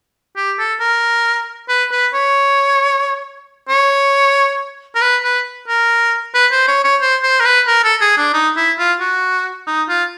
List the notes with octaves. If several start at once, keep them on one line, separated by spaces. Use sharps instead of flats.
G4
A4
A#4
B4
B4
C#5
C#5
A#4
B4
B4
A#4
B4
C5
C#5
C#5
C5
C5
A#4
B4
A#4
A4
G#4
D4
D#4
E4
F4
F#4
D#4
F4